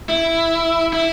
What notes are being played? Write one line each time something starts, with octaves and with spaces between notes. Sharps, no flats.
E4
E4